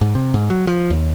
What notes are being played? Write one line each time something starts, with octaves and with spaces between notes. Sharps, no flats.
G#2
C3
G#2
F#3
F3
D#2